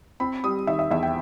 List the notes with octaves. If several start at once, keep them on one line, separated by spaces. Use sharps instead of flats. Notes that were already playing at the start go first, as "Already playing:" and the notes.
C4 B5
G3 D#6
D#3 E5
E5
E2 E5
G5